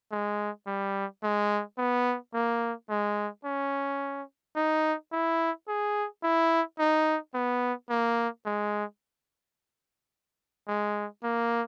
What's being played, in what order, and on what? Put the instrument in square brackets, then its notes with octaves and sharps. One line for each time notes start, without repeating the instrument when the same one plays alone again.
[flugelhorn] G#3
G3
G#3
B3
A#3
G#3
C#4
D#4
E4
G#4
E4
D#4
B3
A#3
G#3
G#3
A#3